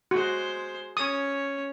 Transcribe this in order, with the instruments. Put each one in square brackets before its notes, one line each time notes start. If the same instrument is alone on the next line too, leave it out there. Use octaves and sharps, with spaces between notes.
[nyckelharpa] G#3 C5 [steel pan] F#4
[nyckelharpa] C#4 C#5 [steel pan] D#6